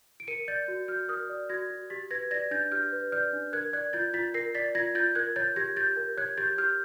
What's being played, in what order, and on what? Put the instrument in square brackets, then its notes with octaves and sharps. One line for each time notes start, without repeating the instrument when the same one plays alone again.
[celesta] D7
A#4 C#7 D#7
D5 G6 A6
F#4
F#4 F6 G6
A#4 D#6 F6
D5
F#4 G#6 A#6
F#4
G4 A6 B6
B4 G#6 A#6
D5 G#6 A#6
D4 G6 A6
G4 F6 G6
B4
D5 F6 G6
D4
A#4 F#6 G#6
D5 F#6 G#6
F4 G6 A6
F4 A6 B6
A#4 A#6 C7
D5 A6 B6
F4 G#6 A#6
F4 G6 A6
A#4 F#6 G#6
C#5 G6 A6
G4 G#6 A#6
G4 G6 A6
A#4
C#5 F#6 G#6
G4 G6 A6
G4 F6 G6